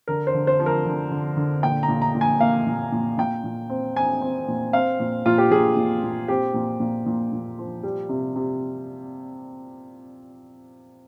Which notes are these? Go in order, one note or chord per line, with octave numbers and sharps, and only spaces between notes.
D3 A#4
C5
D3
C5
F3
A#4
D3
D3
D3
A#2 G5
A#5
A#2
A#5
A#2
G#5
A#3 F5
A#2
A#2
A#2 G5
A#2
C4
C4 G#5
C4
A#2
C4 F5
A#2
A#2 F4
G4
A#2 G#4
A#2
A#2
C4 G4
A#2
A#2
A#2
A#2
F3
G3
C3
C3